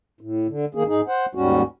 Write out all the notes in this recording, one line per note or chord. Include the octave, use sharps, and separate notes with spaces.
A2
D3
D#3 A#3 G#4
G#2 D#4 G#4
C5 F#5
D#2 G#2 G3 C#4 F#4